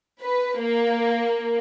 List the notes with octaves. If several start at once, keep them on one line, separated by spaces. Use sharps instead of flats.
B4
A#3